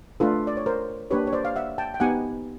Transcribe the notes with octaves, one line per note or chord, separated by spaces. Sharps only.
A3 D4 F4 A4 B4
D5
C#5
A#4 C5
A#3 D4 G4 B4 C#5
C#5
C5 D5
F5
E5 F#5
G5 A5
G5
B3 D#4 G4 F#5 G#5